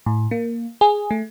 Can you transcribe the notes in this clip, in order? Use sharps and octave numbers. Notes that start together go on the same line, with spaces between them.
A2
A#3
G#4
A3